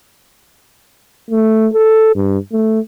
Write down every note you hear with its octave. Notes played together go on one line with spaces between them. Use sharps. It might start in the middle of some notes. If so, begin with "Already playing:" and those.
A3
A4
G2
A3